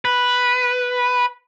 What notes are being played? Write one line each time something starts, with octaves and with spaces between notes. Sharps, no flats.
B4